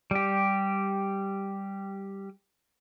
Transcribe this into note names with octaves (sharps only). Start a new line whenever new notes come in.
G3 G4